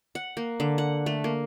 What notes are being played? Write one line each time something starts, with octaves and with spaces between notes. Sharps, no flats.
F#5
A#3
D3
F#5
A3
A#3